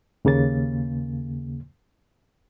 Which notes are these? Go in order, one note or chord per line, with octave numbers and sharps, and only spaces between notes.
D#2 C#3 A#3 A6